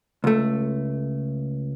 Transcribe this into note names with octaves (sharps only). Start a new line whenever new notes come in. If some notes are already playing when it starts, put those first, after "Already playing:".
C#2 A3